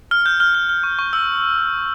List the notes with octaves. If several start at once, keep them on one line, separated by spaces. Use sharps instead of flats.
F6
G6
F6
F6
F6
C#6
C#6
E6